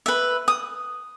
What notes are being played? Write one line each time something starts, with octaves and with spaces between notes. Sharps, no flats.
B4 E5
D#6